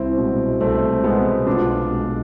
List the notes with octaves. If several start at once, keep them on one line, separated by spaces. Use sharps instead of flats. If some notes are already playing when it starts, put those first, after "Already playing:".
Already playing: C2 C4 E4
B2 G#3
C2 A3 C4
B2 G#3 B3
B1 D4 F4
B2 G#3